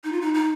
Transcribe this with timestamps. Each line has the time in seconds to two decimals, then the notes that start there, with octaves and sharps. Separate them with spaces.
0.04 D#4
0.12 F4
0.21 D#4
0.34 D#4